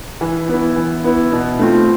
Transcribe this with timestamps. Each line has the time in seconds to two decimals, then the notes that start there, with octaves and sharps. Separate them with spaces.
0.21 E3
0.49 B3 E4
0.76 E3
1.04 B3 E4
1.32 B2
1.59 A3 C4 F4